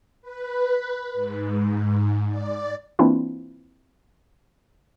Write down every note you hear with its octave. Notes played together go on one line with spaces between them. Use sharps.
B4
G#2
D5
E3 A#3 C4 D4 E4 F4